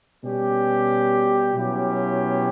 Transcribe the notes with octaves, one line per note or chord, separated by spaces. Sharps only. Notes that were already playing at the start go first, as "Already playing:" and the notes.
B2 G3 C#4 G4
B2 F#3 C#4 E4 G4